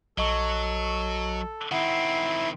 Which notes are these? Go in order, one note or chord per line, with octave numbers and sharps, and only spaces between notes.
A#1 F#3 A4 D#5 C#6
D#3 C4 E4 F#5